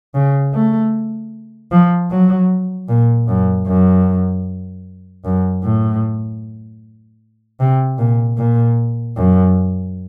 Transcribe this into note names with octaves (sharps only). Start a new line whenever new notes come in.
C#3
A3
F3
F#3
A#2
F#2
F#2
F#2
A2
C3
A#2
A#2
F#2